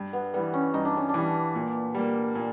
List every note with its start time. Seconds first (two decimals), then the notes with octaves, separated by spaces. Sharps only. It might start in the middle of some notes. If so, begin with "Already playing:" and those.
Already playing: G2
0.13 B3
0.34 E3 G3 B3
0.54 C#4
0.74 G2 D#4
0.85 D4
0.97 C#4
1.09 D4
1.14 E3 G3
1.55 A#2
1.94 G3 A#3
2.35 A#2